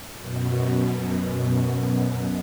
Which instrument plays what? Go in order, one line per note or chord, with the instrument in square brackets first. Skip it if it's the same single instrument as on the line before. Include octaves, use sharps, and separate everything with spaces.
[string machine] F#2 B2